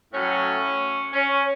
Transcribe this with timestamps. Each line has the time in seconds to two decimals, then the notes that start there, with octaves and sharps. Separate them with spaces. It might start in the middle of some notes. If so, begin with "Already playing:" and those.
0.14 A2 F#3 C#4
1.13 C#4